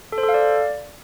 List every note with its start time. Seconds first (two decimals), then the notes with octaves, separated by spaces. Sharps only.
0.12 A4
0.18 C5
0.23 A4
0.29 F5
0.34 D5